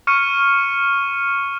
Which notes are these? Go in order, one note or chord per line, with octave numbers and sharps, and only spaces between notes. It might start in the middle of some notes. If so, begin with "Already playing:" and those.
C#6 F6 C#7 D#7